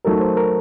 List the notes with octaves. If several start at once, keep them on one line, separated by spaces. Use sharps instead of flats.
F#3 A3 D#4 A4 A#4
C5
A#4